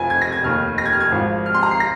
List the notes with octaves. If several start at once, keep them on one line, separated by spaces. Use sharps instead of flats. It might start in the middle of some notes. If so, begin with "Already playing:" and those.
Already playing: F1 F2 F3 G#5
G#6
A#6
G#6
F1 D#2 D#3 F6
A#6
G#6
F6
G#6
G#1 G#2 F3
F6
C6
A#5
C7
A#6